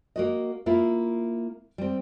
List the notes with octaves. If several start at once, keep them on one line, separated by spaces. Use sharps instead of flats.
A#3 F#4 D#5
A#3 E4 F4
G3 C4